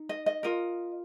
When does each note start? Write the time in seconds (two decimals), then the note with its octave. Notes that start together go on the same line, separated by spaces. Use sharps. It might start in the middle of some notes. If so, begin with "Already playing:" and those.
Already playing: D#4
0.09 D#5
0.26 D#5
0.43 F4 A#4 D#5